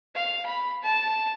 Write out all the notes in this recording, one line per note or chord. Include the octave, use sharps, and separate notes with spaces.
F5
B5
A5